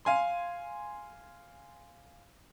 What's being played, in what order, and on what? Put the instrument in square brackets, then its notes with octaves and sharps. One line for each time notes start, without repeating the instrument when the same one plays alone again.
[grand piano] F5 G#5 C6